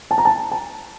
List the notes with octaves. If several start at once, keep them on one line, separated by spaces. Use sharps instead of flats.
A5
A#5
A5
A5